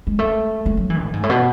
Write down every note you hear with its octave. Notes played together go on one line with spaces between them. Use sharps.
G#3
A3
A3
F#3
E3
A2
G#2
A2
B2